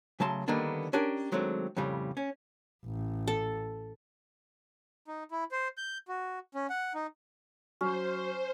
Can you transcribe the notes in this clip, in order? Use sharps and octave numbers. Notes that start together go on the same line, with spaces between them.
C#3 F#3 A3 A5 C6
D3 D#3 G3 A#3 B3 D4
C#4 D4 G4 A#4
D#3 F#3 G#3 A3 C4 D4
F2 A2 C#3 G3
C#4
A1
A4
D#4
E4
C5
G6
F#4
C#4
F#5
D#4
F#3 C#4 C5